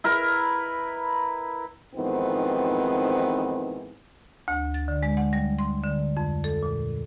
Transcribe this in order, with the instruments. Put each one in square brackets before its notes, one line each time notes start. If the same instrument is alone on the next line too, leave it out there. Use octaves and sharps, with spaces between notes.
[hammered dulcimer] E4 A#4 B4
[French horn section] F2 G#2 D#3 E3 B3 C4
[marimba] D2
A6
D3
G#3
F#5
G3
C6
D3
F2
A4
A#2